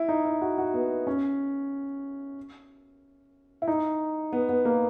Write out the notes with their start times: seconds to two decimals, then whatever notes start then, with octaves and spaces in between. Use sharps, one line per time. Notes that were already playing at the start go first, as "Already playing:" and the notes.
Already playing: E4
0.09 D#4
0.25 E4
0.42 F#4
0.58 F#4
0.74 B3
1.07 C#4
3.62 E4
3.68 D#4
4.33 B3
4.49 B3
4.65 A#3